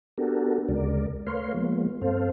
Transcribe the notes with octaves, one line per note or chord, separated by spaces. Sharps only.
B3 D4 F#4 G4 A4 A#4
D2 C#3 G#3 A#4 D5
A3 A#4 B4 C#5 F5 C6
F3 G#3 A#3 B3
G2 C4 A4 C5 F5